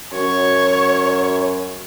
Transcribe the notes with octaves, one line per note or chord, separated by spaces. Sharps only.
F#2 C#5